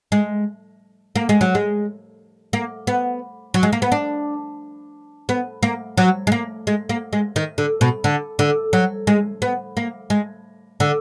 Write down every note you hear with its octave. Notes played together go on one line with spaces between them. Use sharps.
G#3
A#3
G#3
F#3
G#3
A#3
B3
F#3
G#3
A#3
B3
D4
B3
A#3
F#3
G#3
A#3
G#3
A#3
G#3
D#3
D3
B2
D3
D3
F#3
G#3
B3
A#3
G#3
D3